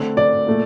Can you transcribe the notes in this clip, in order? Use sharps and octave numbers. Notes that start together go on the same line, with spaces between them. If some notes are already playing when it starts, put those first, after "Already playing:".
Already playing: D3 A3 C4
D5
A#2 A3